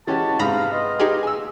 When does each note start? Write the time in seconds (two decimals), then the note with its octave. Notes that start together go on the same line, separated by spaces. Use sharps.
0.07 E3 G#3 C#4 F#4 G4 A5
0.39 G#2 C3 G#4 B4 F5 A#5 B5
0.72 B3 F4 D#5
1.00 D#4 G4 G#4
1.23 G#5 E6